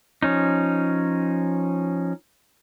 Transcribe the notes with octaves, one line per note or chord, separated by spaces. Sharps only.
F3 C#4 D#4